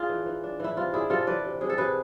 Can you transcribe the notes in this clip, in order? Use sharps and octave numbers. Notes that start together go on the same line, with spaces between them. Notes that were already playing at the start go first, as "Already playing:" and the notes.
Already playing: A3 D4 F4 G#4
E3
E3
D4
E3 E4
C3 F4
D4 E4 G#4
C3 F4 A4
E3 B4 D5
C3
C3 G#4
A4
C3 G#4 B4